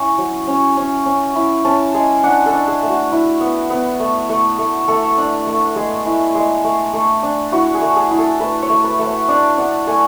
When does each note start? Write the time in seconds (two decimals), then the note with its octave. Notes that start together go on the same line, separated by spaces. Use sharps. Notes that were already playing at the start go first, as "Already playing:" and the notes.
Already playing: C#4 E4 C#6
0.18 F#3
0.47 C#4
0.77 C#4
1.06 C#4
1.35 E4
1.65 C#4 A5
1.94 G#3 G#5
2.24 D4 F#5
2.46 A4
2.53 D4
2.67 G#4
2.83 A3
2.90 F#4
3.12 E4
3.41 B3
3.70 B3
4.00 A3
4.29 A3
4.58 A3
4.88 A3 A4
5.18 D4
5.47 A3
5.76 G#3 G#4
6.05 E4
6.35 G#3
6.64 A3
6.94 A3
7.23 D4
7.52 E4 F#4
7.74 G#4
7.81 A3
7.96 G#4
8.11 E4
8.18 A4
8.40 A3 B4
8.62 C#5
8.70 A3
8.84 B4
8.99 A3
9.06 C#5
9.28 D4 D5
9.58 D4 F#5
9.87 A3 G#5